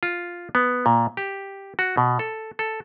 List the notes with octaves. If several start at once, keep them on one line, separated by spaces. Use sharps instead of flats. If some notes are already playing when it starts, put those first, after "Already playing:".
F4
B3
A#2
G4
F#4
B2
A4
A4